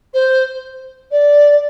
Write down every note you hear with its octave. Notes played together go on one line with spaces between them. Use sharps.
C5
D5